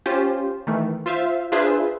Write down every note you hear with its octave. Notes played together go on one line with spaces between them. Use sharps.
C#4 F4 G4 C5
D#3 E3 A3
F4 C5 E5 F5
D4 F4 G#4 B4 C5 E5